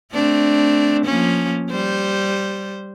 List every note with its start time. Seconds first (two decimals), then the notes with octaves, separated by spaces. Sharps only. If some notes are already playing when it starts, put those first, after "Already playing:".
0.13 A3 C4 D4
1.05 F3 A#3 C#4
1.70 G3 C5